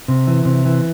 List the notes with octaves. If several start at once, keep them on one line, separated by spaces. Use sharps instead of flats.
C3
E3
C3
E3